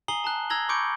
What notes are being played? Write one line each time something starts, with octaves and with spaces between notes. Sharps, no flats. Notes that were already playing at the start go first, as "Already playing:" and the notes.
G#5 A#5 D#6 C7 F#7 G7
A5 A#5 F#6
A#5 E6 G#6 A#6 F#7 G7
B5 C#6 D6 G6 C#7 D7